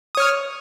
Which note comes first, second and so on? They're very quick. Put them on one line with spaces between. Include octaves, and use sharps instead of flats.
D#6 C#5 F6